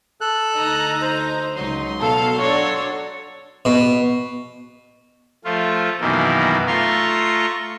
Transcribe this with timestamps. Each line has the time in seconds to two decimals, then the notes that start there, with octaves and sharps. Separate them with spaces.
0.21 A4 F#6
0.54 D2 D#4 A#5
1.02 C5
1.56 C#2 F#3 D#4 C6
2.00 B2 A4 F5
2.40 D4 F#4 A4 C#5
3.65 B2
5.44 F3 A3 F4
6.01 F#2 B2 D#3 E3 A#3
6.67 A3 F4 A#5 C6 C#6